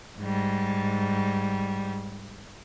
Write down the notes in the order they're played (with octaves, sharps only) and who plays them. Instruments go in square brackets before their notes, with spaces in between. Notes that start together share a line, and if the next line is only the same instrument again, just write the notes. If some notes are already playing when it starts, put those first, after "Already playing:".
[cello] G#2 G3